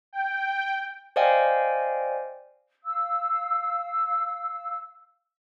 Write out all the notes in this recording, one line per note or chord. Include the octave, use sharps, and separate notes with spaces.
G5
C5 D5 D#5 F5 G5 G#5
F5 E6